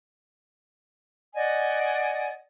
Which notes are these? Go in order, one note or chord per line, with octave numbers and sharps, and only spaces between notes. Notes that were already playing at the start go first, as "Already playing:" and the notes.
D5 D#5 F#5 G#5